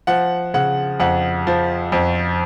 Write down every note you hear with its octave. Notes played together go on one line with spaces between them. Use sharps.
F3 F#5
C#3 F#5
F2 F#5
F3
F2